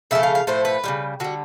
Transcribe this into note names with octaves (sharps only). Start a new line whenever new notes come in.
C#3 F3 A3 E5
F5
F5
A2 F3 A3 C5
B4
C#3 E3 G3
D3 G3 F#4